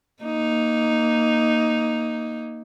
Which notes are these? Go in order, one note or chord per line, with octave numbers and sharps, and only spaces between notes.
A#3 D#4